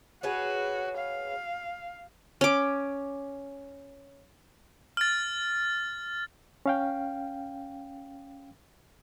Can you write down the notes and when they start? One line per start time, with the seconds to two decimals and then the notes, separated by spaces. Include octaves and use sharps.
0.23 F#4 G#4 B4 C#5
0.97 F5
2.41 C#4 D6
4.97 F6 A6
6.66 C#4 F5 G5